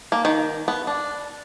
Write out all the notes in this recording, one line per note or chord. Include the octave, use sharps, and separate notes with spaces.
A#3
D#3
B3
D4